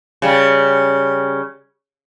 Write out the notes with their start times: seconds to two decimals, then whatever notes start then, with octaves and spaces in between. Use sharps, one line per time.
0.22 C#3 G3